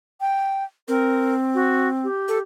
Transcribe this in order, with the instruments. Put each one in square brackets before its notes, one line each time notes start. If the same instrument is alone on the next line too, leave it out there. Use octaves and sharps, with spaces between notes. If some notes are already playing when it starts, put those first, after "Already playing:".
[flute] G5
[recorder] C4 [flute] A#4
[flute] F#4
G4
[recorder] A4